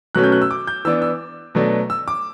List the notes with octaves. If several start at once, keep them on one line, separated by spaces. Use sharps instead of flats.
B2 F#3 A3 C#4 F#6
G6
F#6
E6
D6
G6
E3 B3 D4 E6
E6
B2 F#3 A3 D4
E6
D6